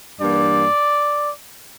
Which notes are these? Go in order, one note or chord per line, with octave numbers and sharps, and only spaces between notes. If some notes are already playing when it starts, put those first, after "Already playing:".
G2 E3 A#3 D5